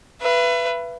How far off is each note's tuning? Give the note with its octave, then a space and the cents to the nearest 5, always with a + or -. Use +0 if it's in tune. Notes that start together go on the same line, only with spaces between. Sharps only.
B4 +0 E5 +40